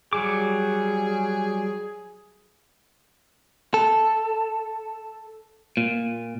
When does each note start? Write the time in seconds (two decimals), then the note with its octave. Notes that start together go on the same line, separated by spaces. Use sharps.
0.13 F#3 G3 G#4 D6
3.74 A4
5.77 A#2